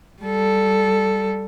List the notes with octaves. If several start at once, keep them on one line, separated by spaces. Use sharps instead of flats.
G3 A4